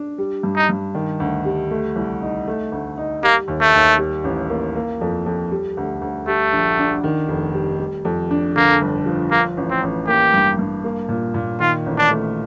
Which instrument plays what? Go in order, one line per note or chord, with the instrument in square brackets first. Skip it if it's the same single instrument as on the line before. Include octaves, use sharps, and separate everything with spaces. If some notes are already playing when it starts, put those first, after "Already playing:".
Already playing: [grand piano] D4
G3
G2
[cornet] D#4
[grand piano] G2
D#3
D2
G3
A3
C2
D#4
A3
D2
D#4
[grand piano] G3 [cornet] A#3
[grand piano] D#2
[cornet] A3
[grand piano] D#2
G3
A1
A#3
A#3
F2
F2
G3
D2
D2
[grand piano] G3 [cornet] A3
[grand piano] A#1
D4
D#3
F1
G3
G3
F2
D4
[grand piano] D3 [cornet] A#3
[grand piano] G1
F3
[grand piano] F3 [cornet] A#3
[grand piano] A1
[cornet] C4
[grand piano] A1
[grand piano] A#3 [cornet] G4
[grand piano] G2
G2
A#3
A#2
A#2
[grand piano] D#3 [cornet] F4
[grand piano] A1
[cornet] D4
[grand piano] A3